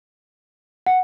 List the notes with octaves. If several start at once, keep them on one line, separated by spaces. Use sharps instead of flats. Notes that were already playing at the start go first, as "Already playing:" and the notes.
F#5